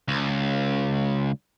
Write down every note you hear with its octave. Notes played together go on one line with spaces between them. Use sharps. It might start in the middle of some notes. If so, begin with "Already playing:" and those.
C#2